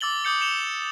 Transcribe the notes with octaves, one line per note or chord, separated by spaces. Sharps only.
D6 E6 A6 F#7 G7
D6 D#6 G6 C#7
C#7 E7 F7 G7